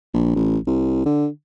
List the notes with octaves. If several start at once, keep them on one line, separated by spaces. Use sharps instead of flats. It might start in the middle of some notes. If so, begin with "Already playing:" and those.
A#1
A1
C2
D3